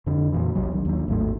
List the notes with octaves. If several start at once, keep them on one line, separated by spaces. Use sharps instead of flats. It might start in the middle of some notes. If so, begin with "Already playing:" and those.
F2 D3
F2 A#2 E3
A#1 C3 F#3
C2 D#3
D#2 F#3
G#1 D#2 A2 A3